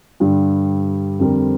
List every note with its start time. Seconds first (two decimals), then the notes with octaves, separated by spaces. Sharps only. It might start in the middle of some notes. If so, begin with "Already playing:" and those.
0.20 G2 D3 G3
1.19 F2 D3 G3 C4 A#4